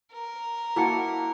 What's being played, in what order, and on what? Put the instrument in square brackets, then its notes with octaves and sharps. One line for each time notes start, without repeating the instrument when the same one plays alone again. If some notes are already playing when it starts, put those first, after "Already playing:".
[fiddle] A#4
[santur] A#3 F#4 D6 [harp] E4 A5 C#7